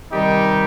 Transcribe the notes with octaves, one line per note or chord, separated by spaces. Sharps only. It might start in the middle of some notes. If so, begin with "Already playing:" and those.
C3 D#3 G3 D#4 G4